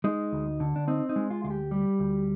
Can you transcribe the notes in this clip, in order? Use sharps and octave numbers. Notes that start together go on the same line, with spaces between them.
G#3 D#4
D2
D3
D4
C4 D#4
D#4
G#3
F4
D2 F4
G4
G3
D2